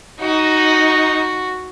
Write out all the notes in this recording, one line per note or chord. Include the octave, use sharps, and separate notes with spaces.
D#4 F#4